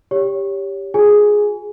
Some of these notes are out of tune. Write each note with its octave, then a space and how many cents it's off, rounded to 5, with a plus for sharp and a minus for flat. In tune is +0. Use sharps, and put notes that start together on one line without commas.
G4 +10 C#5 +15
F4 +45 G#4 +0 G#5 +0